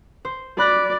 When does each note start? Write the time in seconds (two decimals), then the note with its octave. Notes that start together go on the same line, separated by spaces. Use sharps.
0.25 C5
0.58 D5 B5 F#6 A#6